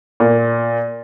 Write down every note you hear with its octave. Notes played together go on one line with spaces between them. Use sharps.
A#2